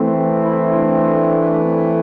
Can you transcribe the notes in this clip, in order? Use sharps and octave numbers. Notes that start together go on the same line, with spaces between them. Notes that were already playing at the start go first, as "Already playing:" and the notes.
Already playing: E3 A3 C4
E4
D4
C4